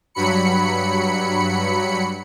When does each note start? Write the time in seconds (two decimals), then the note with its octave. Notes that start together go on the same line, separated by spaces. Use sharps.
0.15 G2 F#3 B5 C#7